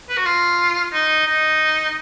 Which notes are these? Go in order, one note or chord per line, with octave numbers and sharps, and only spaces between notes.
B4
F#4
F4
D#4
D#4